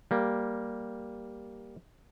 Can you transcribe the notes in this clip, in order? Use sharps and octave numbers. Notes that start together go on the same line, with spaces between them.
G3 A#3